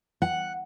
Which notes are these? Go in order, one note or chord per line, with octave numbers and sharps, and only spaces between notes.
F#5